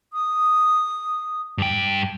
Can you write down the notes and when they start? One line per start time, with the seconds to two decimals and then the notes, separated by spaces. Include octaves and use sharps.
0.13 D#6
1.58 G2 G5